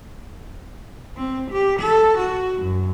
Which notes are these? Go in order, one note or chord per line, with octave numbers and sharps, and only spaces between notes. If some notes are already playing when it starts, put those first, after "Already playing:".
C4
G4
A4
F#4
F#2